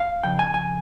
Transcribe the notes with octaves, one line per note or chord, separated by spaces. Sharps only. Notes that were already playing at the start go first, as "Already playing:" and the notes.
Already playing: F5
F2 C#3 G5
G#5
G#5